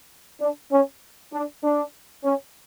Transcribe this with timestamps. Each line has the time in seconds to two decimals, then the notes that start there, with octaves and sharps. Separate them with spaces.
0.41 D4
0.71 C#4
1.33 D4
1.63 D4
2.24 C#4